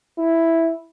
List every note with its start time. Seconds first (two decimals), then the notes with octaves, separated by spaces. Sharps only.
0.18 E4